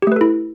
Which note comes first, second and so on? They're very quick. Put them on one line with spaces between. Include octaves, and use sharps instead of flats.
G4 A3 B4 A4 E4